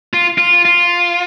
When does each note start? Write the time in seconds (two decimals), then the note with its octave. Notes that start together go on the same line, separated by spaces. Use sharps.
0.13 F4
0.38 F4
0.65 F4